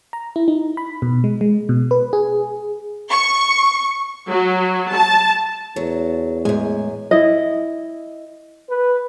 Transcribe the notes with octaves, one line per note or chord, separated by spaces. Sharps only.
A#5
E4
D#4
B5
B2
G#3
G#3
B2
B4
G#4
C#6
F#3
A5
E2 F#3
F#2 A2 G#3 G#5
E4 D#5
B4